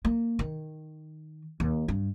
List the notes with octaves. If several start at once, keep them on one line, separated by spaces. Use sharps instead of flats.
A#3
D#3
D#2
G2